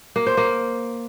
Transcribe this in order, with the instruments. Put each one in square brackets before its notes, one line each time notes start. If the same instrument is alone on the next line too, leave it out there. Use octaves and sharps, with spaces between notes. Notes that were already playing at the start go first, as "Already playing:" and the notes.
[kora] A#3
C5
A#3